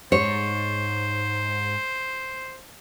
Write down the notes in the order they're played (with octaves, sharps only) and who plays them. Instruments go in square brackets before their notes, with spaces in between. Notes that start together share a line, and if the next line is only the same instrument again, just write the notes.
[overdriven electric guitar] G#2 [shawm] C5 [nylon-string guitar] C#5